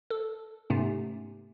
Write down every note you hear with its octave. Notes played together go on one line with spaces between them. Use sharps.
A4
G#2 C3 A3 B3 C#4